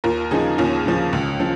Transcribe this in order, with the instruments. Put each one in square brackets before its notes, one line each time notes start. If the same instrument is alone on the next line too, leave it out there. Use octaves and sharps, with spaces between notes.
[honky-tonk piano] D#2 F4 A#4
C#3 F3 D#4 G#4
D#2 C#4 F4
C#3 F3
C#2
C#3 F3